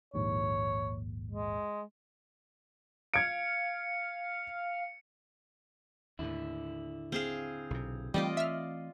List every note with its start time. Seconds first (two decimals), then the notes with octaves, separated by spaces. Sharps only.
0.14 A#1 D#2 G#2 C#5
1.31 G#3
3.14 F5 G#6 C#7 D7
6.19 D#2 A2 D3 E4
7.12 C4 G#4 F5
7.70 B1 C3
8.14 E3 G3 A3 C4 F4 D5 D#5
8.37 E5 F6